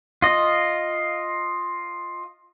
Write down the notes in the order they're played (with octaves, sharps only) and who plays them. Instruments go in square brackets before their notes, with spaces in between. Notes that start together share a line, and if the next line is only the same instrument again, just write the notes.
[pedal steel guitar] F4 D#5